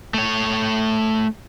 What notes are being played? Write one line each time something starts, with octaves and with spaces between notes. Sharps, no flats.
A3 C#5